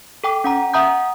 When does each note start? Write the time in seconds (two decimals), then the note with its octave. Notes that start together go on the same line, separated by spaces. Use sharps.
0.24 A4 G5 D6
0.44 C#4 F#5 A#5
0.74 E5 F#5 A#5 D#6 G6